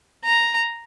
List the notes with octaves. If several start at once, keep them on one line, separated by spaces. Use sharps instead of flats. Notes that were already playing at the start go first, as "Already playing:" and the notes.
A#5